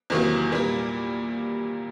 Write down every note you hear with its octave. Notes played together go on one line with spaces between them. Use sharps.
E2 C3 D#3 F#3 A#3
A#2 G3 A#3